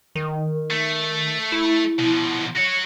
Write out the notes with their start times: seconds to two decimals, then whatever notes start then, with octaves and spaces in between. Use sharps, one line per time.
0.15 D#3
0.70 A3
1.52 E4
1.99 B2 F3
2.57 F#4 C#5